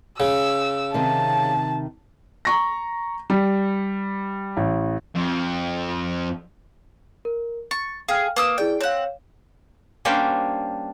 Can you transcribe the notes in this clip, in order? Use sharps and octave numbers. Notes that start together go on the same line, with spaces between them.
C#3 E6
C3 D#3 C4 A5
A#5 C#6 A#6
G3
A1
F2
A#4
C#6 A6
G#4 F5 G5 F6
A#3 B4 D#6 E6
E4 G#4 D5 G5
C4 C#5 F5 F#5
G3 A#3 C#4 D4 C5